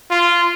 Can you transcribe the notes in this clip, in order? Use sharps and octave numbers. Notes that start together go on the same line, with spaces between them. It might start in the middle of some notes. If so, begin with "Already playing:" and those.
F4